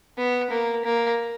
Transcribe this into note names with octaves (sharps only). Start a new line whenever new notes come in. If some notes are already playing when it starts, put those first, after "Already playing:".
B3
A#3
A#3